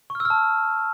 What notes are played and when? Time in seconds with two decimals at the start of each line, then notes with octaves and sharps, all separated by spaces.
0.10 C#6
0.15 F6
0.20 E6
0.25 F6
0.30 A5